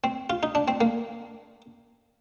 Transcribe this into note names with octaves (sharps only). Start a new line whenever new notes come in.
C4
F4
D#4
D4
C4
A#3